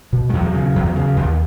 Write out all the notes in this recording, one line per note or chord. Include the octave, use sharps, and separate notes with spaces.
B2
G#3
E2 F#3
C#3
E2
C#3
D#2